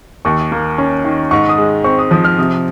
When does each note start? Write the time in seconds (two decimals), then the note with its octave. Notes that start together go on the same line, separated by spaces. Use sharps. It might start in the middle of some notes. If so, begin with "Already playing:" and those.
0.25 D#2 C#6
0.52 A#3
0.78 C#4
1.04 D#3
1.31 G#2 C#6
1.49 D#6
1.58 G#3
1.84 C4 C#6
1.99 D#6
2.11 F3 D#6
2.24 F6
2.38 C3 D#6